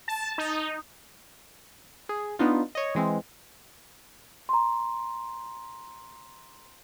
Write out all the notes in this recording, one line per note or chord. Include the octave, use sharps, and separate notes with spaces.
A5
D#4
G#4
B3 D4 D#4 F4
C#5 D#5
E3 G#3 C4
A#5 C6